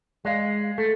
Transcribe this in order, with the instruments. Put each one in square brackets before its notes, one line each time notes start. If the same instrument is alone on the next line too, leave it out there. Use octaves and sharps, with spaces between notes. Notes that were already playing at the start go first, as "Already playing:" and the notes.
[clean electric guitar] G#3 [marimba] D5 D#5 F5
[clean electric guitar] A3 [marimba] A4